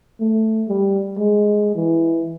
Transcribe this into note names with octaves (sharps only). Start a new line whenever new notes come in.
A3
G3
G#3
E3